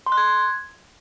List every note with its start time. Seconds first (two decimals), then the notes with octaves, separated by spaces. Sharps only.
0.06 C6
0.12 F#6
0.17 G#6